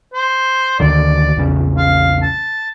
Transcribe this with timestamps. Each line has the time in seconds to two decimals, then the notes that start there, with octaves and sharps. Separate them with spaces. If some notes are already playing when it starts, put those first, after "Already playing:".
0.14 C5
0.80 D2 D3 D#3 D5
1.36 A#1 E2 C#3
1.78 F5
2.22 A5